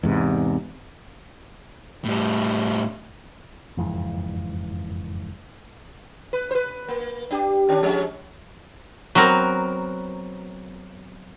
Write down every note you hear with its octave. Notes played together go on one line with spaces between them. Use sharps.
E2 G#2 C3
A2 G3
F#1 F2 G#2 E3
B4
B4 C5
A#3
D4 G4
D#3 C#4 D4
F3 G#3 C#4
F#3 B3 C4 A#4